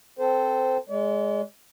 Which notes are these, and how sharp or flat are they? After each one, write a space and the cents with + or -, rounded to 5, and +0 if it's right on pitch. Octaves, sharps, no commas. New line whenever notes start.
C4 -5 A4 +0 C5 -15
G#3 +0 D5 -45